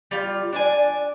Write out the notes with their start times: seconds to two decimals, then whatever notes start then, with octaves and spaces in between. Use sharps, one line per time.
0.11 G3 F4
0.52 D4 D5 G#5